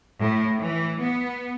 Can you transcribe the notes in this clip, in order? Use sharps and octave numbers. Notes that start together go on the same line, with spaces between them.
A2
E3
B3